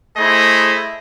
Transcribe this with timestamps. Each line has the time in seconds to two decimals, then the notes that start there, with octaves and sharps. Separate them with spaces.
0.17 A3 E4 G#4 C5 D#5